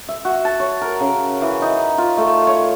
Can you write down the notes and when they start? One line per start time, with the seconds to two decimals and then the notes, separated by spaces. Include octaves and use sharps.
0.09 E5
0.25 F#4
0.45 A5
0.60 C#5
0.81 A#4
1.00 C#3
1.42 E3
1.62 D#4
1.98 F4
2.17 A3
2.47 C#5